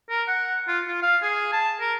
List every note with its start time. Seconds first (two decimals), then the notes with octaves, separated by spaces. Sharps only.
0.10 A#4
0.28 F#5
0.68 F4
0.87 F4
1.03 F5
1.22 G#4
1.53 A5
1.80 A#4